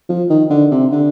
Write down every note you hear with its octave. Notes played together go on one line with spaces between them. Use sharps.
F3
D#3
D3
C3
D3